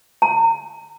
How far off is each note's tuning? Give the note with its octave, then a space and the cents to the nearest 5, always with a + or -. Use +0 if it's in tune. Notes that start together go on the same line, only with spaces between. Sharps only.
A#5 -35